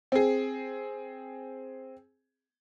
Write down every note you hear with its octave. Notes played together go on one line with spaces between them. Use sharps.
C4 G#4